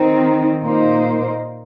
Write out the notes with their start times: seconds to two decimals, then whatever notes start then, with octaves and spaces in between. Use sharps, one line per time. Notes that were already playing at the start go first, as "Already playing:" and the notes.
Already playing: D#3 C4 D#4
0.62 A#2 A#3 D#4 C5